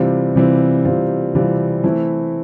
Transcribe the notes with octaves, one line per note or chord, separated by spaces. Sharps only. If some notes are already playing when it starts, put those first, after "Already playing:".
Already playing: C3 E3 G3 C4 F4
C3 E3 G3 C4 F4
C3 E3 G3 C4 F4
C3 E3 G3 C4 F4
E3 A3 C4 E4